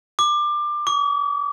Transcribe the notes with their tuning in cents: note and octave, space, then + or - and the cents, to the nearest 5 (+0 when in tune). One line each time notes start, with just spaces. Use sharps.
D6 +20
D6 -45